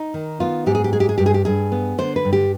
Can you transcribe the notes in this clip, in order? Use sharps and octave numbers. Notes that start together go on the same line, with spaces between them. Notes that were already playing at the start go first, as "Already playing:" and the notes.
Already playing: D#4
D#3
B3 F4
G#2 G4
G#4
G4
G#3 G#4
G4
G#4
G2 G4
G#4
G4
G2 G#4
B3
D3 C5
B4
G2
G4